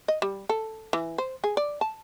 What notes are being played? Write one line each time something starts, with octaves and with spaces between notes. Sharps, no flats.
D#5
G3
A4
E3
C5
G#4
D5
A5